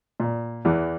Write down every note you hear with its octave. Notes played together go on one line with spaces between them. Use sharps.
A#2
E2 E3